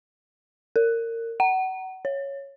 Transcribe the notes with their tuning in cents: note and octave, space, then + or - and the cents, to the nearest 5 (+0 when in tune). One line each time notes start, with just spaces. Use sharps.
A#4 -25
F#5 +30
C#5 -5